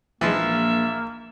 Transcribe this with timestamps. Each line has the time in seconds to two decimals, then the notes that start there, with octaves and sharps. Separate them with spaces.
0.21 A#1 E3 F3 G#3 A#3 E5